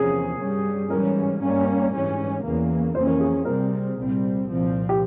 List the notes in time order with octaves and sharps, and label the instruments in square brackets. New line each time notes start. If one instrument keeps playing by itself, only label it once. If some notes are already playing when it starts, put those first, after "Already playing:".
Already playing: [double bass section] E2 C3 F3 A#3 C#4 [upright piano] G#4
[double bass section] G2 G3 C#4
[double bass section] G#2 E3 G3 C#4 [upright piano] A#4
[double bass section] G2 G3 A#3 C#4
G#2 E3 G3 C#4
E2 C#3 E3 A#3
[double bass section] F2 E3 A#3 C#4 [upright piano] C5
[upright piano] A#4
G#4
[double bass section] C3 G3 C4 [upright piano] A#4
[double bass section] C2 A#2 G3 C4
C2 A#2 F3 C4
[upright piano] G4